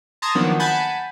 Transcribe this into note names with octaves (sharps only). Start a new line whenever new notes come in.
A5 A#5 C6 D#6 G#6 A6
D#3 F3 F#3 A#3 B3 D4
F#5 G#5 A5 B5 G6 A6